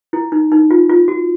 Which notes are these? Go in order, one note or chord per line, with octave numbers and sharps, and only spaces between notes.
E4
D#4
D#4
F4
F4
F#4